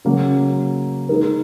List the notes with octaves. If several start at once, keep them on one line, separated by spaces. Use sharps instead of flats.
C#3 F#3 A#3
G#3 D#4 A#4